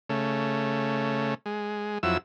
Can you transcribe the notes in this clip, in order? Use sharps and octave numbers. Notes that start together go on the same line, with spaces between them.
C#3 A3
G#3
F2 F#3 E4 E6